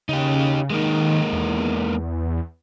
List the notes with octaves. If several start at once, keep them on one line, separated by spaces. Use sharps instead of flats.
C#3 D#4 G4
D#3 G#3 A#3 D#4
E2